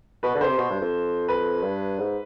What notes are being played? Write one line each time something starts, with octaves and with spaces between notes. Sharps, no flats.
B2 B4
D3
C5
C3
B2
G2
F2
B4
G2
G#2